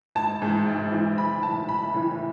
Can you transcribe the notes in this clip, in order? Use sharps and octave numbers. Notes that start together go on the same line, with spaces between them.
G#1 A5
G#2 E3
G#1
G#2 E3
B1 B5
A2 E3 A5
B1 B5
A2 E3